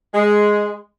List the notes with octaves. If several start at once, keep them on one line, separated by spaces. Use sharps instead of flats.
G#3